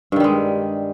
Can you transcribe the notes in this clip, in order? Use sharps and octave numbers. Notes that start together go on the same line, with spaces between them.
G2 D#3 G3 G#3